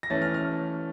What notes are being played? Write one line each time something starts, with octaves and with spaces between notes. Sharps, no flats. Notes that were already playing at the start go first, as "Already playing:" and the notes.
A#6
E3 A3 C#4 A6
F6
F6